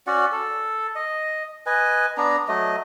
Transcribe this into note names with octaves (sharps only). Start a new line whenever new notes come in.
C#4 F#4 D5 F#5
A4
D#5
B4 D#5 G#5
B3 D4 A#5
F#3 A3 D#5